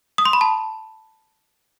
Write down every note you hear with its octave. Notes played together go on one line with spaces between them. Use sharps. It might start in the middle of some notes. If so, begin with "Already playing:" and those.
D#6
C6
B5
A5